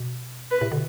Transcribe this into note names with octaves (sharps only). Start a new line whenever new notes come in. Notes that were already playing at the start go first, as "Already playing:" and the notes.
Already playing: B2
B4
A2 C3
B2 D3